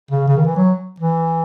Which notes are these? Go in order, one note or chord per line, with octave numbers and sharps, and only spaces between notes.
C#3
C#3
D#3
E3
F#3
E3